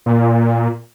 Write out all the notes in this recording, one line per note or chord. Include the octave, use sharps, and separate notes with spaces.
A#2